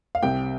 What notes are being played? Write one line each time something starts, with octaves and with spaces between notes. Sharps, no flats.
F5
C2 C3 G5